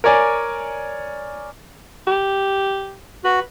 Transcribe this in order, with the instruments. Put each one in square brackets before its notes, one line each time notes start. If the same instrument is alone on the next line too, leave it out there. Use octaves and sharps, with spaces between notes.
[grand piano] A#4 C#5 D5 G#5
[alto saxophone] G4
[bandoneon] F#4 [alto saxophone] B4